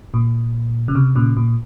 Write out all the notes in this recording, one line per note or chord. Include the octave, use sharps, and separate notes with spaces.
A#2
C#3
C3
A#2 C#3
A#2